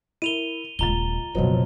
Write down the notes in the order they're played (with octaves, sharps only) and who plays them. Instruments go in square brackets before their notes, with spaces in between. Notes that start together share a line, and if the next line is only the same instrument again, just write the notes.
[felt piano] E4 A#4 [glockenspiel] D#7 F7 G7
[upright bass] D#1 G#3 [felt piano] C#2 F4 A6 [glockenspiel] A#5 G7
[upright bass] F#1 D3 [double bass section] B2 F3 F#3 [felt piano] F#4 B4 D#5